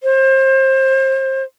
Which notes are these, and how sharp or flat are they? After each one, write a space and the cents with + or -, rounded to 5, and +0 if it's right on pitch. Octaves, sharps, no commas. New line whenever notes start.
C5 +30